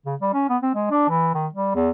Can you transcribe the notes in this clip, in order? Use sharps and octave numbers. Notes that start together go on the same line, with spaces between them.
C#3
G3
C#4
B3
C4
G#3
D4
E3
D#3
G3
E2